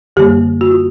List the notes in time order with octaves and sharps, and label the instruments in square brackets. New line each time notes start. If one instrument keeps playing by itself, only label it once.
[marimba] F#2 D3 G3 A#3 G4
F#4
F4